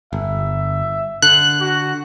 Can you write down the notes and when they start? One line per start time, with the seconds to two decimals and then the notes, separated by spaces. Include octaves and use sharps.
0.13 G1 E5
1.22 D3 F#6
1.60 F#4